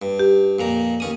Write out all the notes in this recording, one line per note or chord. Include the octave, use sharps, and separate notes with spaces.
G2
G4
F2 A#2 A#5
D#2 C#4 D#6